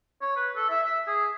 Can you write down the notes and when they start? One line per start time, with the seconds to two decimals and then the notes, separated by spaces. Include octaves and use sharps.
0.22 C#5
0.36 B4
0.56 A4
0.70 E5
0.83 E5
1.07 G#4